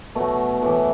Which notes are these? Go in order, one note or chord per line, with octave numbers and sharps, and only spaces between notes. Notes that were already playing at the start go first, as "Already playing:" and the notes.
B2 F#3 A3
A2 E3